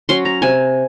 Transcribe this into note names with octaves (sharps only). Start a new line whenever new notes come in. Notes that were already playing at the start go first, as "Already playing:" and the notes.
F#3 C#4 C6
A#5
C3 G#5